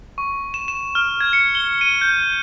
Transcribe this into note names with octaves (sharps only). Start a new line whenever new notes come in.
C#6
E7
E7
F6
G#6
C#7
G7
D#7
G6